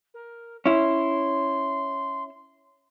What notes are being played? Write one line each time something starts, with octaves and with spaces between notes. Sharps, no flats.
A#4
C#4 E4 C6